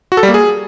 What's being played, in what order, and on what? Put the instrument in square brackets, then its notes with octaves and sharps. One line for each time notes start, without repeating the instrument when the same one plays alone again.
[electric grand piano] F#4
A4
G3
A#3
G#4